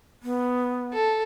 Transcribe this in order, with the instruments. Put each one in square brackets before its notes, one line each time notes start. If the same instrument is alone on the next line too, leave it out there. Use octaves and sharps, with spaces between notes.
[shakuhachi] B3
[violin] A4